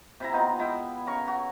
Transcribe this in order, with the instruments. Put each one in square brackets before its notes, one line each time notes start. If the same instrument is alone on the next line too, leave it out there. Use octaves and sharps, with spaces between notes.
[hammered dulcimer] C3 E4 A#5
B3 D#4 F4
G#3 E4 G5
C#3 A#4 C#6
F#4